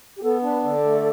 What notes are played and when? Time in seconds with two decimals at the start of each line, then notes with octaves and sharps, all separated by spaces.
0.17 G4
0.23 B3 A4
0.42 D4 B4
0.63 D3 A4 D5
0.85 A3